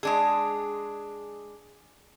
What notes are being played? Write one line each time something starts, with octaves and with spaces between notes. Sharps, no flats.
G#3 D4 G#4